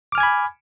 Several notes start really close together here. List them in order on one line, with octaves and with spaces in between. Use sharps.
D6 F6 G#5 G#6 B5